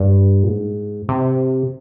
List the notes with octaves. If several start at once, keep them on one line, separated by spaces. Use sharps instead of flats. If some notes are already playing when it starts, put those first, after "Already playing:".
Already playing: G2
A#2
G#2
C3